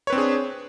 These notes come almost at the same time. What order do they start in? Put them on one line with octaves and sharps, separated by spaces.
C#5 B4 C4 D4 G#4